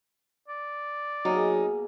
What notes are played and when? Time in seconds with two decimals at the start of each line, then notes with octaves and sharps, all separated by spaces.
0.48 D5
1.25 B2 F#3 A#3 D#4 G#4